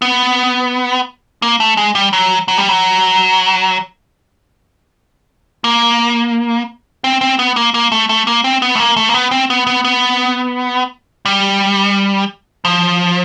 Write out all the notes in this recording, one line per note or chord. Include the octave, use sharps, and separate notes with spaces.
B3
A#3
A3
G#3
G3
F#3
F#3
G3
F#3
A#3
C4
C4
B3
A#3
A#3
A3
A3
A#3
C4
B3
A3
A#3
A3
A#3
B3
C4
B3
B3
B3
G3
F3